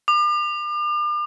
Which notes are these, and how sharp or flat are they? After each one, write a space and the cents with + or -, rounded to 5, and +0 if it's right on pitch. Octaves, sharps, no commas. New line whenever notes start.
D6 +40